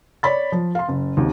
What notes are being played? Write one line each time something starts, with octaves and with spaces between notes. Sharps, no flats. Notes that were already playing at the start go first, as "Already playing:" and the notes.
C#5 D5 B5 A6
F3
F5 C6
F#1
G#1 D#2